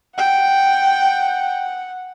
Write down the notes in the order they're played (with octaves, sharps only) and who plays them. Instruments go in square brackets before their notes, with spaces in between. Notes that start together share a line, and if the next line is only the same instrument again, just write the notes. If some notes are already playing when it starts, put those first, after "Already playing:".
[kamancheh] F#5 [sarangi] G5